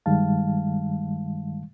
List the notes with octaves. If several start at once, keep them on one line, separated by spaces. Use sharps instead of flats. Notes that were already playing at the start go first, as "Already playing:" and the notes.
G2 D#3 G3 G#3 F5 A5